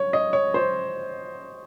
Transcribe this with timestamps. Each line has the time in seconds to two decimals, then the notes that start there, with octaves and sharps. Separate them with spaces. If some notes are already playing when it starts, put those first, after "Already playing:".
Already playing: C#5
0.13 D#5
0.33 C#5
0.54 C5